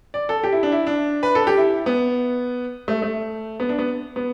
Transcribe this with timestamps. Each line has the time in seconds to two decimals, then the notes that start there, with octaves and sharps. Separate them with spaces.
0.14 D5
0.29 A4
0.44 G4
0.52 E4
0.63 D4
0.72 E4
0.87 D4
1.23 B4
1.35 A4
1.47 G4
1.57 E4
1.86 B3
2.88 A3
3.02 A3
3.60 B3
3.69 D4
3.78 B3
4.16 B3